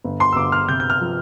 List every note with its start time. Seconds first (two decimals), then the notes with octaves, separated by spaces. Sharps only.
0.04 G1
0.20 C6
0.32 E6
0.36 G1 D6
0.52 F6
0.69 C3 G6
0.80 G6
0.90 F6
1.01 F3